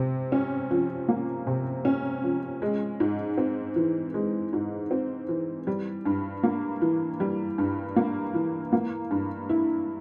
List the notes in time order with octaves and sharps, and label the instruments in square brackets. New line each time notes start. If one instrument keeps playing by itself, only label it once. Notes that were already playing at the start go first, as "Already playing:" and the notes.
Already playing: [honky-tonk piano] C3
C#4
F3
A#3
C3
C#4
F3
G#3
G#2
C4
E3
G#3
G#2
C4
E3
G3
G2
A#3
E3
G3
G2
A#3
E3
A#3
G2
E4